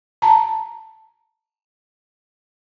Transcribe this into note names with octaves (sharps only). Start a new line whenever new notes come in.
A5 A#5